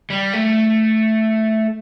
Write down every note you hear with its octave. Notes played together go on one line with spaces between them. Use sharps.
G3
A3